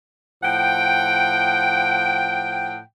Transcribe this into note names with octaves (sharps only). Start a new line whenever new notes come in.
A2 F3 F#5 G5